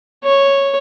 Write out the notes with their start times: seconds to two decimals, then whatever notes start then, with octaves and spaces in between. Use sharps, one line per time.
0.24 C#5